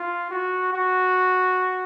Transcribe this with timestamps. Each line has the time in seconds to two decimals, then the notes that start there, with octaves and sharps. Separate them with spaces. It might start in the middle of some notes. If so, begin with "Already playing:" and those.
Already playing: F4
0.31 F#4
0.73 F#4